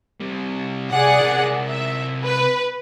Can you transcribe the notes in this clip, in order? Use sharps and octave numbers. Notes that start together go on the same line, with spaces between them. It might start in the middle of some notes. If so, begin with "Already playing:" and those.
C3 G3
C2 G#4 D5 F#5
C3 A#4
E5
B4